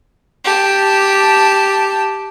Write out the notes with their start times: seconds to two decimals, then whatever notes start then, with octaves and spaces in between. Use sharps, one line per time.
0.45 G4 A5